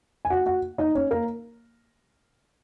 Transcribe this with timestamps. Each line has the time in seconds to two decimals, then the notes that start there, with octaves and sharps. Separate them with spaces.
0.25 G#5
0.30 F#4 F#5
0.46 F#4 F#5
0.78 D#4 D#5
0.95 C#4 C#5
1.11 A#3 A#4